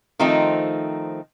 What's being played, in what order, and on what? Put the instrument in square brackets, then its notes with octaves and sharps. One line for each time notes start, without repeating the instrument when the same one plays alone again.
[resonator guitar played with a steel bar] D#3 F3 A3 C4 D#4